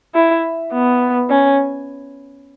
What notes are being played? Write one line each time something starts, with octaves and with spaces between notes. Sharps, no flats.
E4
B3
C#4